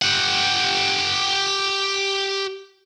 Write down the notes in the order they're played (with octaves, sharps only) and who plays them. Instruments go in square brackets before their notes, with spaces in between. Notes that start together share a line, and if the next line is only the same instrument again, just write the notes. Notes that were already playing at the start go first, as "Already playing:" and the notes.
[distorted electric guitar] G4 F#5